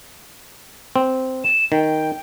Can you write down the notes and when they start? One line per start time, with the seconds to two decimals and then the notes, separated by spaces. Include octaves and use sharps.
0.96 C4
1.44 E7
1.72 D#3 G5